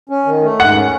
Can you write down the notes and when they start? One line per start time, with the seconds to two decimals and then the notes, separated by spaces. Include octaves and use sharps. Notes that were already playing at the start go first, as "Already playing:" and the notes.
0.09 C#4
0.26 D#3
0.42 A3
0.60 G#2 F#5
0.76 C#4